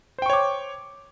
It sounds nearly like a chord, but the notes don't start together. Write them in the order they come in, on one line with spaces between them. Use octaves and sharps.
C5 G5 C#6 C#5 D6